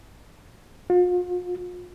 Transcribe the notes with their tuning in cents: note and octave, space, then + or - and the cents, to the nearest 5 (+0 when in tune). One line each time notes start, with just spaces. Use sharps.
F4 +40